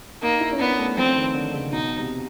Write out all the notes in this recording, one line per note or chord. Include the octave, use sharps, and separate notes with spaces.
A#3 D#4
E4
C#4
B3 D4
A3
F3 C4
D#3
D3
C#3
B2 D#4
C3